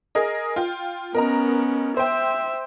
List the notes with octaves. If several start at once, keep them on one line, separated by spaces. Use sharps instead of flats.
G#4 A#4 D#5
F4 G5
B3 C#4 A#4 D#5 A#5
C5 E5 G5